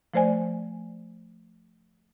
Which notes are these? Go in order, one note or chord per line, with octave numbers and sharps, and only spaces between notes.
F3 A3 C5 D5 G#5